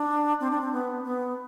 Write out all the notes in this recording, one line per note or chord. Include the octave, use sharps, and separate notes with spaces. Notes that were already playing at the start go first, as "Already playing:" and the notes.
Already playing: D4
C4
D4
C4
B3
B3